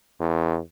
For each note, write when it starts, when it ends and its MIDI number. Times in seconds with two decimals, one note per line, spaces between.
0.20 0.59 40